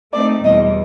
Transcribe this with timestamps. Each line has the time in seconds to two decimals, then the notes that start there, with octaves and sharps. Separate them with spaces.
0.13 A3 C4 D#4 D5
0.44 E2 B2 G3 D#5